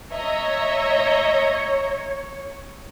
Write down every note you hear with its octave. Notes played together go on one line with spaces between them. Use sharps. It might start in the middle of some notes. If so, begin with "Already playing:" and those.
C#5 D#5 E5 A#5